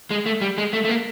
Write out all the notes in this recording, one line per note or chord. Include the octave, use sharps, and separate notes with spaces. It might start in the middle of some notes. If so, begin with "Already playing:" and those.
G#3
A3
G3
G#3
A3
A3
A#3